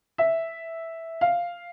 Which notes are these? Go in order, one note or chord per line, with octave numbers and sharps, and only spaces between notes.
E5
F5